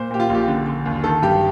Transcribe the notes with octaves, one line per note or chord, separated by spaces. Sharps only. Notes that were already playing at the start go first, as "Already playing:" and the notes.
Already playing: A#2 C5
A#2 G4
F4
A#1
G4
D3
D3
D#2
D#3 A4
G2 G4